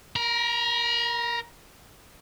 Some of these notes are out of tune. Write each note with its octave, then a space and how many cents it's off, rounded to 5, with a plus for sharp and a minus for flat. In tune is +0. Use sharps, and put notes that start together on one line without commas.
A#4 +0 A#5 +40